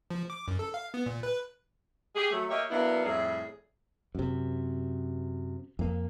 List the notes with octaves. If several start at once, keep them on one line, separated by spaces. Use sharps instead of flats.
F3
D6
F#2
A4
F5
B3
A#2
B4
G4 G#4
F#3 A3
A#3 G4 C#5 D#5 E5
F#3 A#3 B3 D4 E4
F2 A2 G3 G#4 E5
F#2 C3
F2 A#3